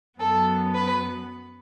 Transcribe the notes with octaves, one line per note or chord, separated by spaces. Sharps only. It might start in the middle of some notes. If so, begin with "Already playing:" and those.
F#2 F#3 B3 A4
B4